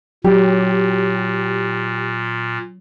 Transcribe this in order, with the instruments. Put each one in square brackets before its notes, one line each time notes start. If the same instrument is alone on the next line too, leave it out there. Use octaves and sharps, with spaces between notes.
[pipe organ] A#2 [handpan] F#3 [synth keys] G4